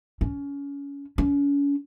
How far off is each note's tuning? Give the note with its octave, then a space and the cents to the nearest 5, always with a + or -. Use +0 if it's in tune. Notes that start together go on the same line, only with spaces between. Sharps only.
C#4 +25
C#4 +35